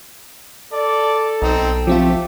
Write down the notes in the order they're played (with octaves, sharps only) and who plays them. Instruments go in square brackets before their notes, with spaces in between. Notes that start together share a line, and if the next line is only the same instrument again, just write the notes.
[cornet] A4 [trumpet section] D5
[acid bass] B1 [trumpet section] C4 D#4
[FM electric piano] F3 C4 F4 [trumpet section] A3 G4